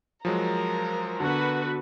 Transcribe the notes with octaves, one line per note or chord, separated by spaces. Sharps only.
F3 F#3 G#3 A#4
D3 B3 F#4 B4